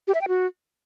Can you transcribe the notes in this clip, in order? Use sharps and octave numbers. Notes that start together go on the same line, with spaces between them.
G4
E5
G5
F#4